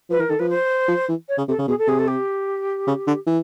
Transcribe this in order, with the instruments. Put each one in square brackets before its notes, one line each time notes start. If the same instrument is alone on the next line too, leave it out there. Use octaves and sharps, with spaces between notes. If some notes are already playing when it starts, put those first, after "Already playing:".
[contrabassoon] F3 [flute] B4
[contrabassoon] E3 [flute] A#4
[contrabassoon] D#3 [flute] A4
[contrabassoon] F3 [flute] B4
[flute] C5
[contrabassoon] F3
E3
[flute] C#5
[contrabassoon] C#3
[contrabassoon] C3 [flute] A4
[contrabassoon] C#3
[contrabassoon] B2 [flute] G#4
[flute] A4
[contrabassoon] C3 [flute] G#4
[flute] A4
G4
[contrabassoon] C#3
D3
E3